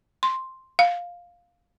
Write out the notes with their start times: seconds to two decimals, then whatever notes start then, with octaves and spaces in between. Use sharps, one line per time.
0.23 C6
0.79 F5